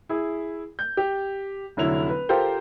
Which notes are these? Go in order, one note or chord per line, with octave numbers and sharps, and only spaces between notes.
E4 G#4
G6
G4
F1 D3 F#3 E4 F7
B4
F4 G4 A4 A#4 C5 G5